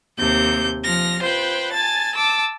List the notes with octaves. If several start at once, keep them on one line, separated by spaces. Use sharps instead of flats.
D#2 C3 G6
F3 F6 A#6
F4 B4 C5 G5
G#5 A5 A6
A5 D6 E6